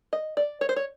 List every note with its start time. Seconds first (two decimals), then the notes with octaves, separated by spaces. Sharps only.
0.13 D#5
0.37 D5
0.61 C#5
0.69 C5
0.76 C#5